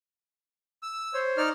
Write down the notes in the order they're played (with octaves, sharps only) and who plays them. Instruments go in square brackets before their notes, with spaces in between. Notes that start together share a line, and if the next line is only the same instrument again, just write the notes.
[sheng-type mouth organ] E6
[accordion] C5 C#5
[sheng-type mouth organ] D#4 D5 F6